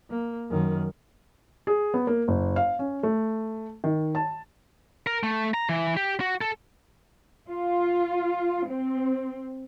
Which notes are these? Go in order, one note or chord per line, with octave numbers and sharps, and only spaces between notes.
A#3
F#2 D#3
G#4
B3
A#3
F#1
F5
C#4
A3
D#3
A5
A#4
A3
A#5
E3
G4
F#4
A4
F4
C4